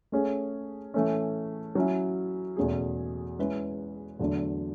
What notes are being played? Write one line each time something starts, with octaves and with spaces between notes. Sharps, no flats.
A3 C#4 G#4 C#5
E3 A3 C#4
F#3 C#4 E4
E2 B2 A3 C#4 G#4
G#3 C#4 E4 B4
E2 D3 F#3 A3 D4